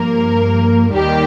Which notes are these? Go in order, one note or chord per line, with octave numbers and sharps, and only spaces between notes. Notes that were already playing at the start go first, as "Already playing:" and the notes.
Already playing: G2 F3 A#3 A#4
D#2 D#3 G3 G4